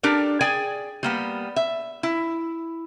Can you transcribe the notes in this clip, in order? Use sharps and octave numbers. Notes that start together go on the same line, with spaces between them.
D4 G4 A4 A#4 D5
G#4 D5 G5 G#5
G3 A#3 B3
E5
E4